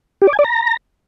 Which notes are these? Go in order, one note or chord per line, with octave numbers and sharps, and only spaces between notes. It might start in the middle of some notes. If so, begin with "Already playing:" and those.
G4
D5
G#5
D5
A#5